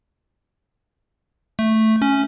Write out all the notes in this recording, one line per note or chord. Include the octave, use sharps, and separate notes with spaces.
A3
C#4